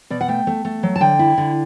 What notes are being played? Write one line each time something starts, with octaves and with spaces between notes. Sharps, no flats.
B2 D5
F#5
A3 G5
A3
A3
F#3
A5
D3 G5
E4
D3